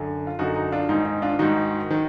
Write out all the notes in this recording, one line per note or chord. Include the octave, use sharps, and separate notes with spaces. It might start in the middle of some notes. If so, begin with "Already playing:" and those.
Already playing: F#2 D3
F4
F#2 D3 D#4 F#4
D#4 F#4
D4 F4
G#2 D#3 D#4
D#4
D4 F4
G#2 D#3 D#4 F#4
D#3